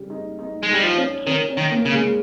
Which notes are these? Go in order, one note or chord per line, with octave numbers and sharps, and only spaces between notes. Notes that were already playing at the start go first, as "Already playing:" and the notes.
Already playing: C#3 G3
D#4
D#4
G#3
G3 D#4
F3
C#4
D#3 C#4
C#4
D#3
A#3
C#3
G#3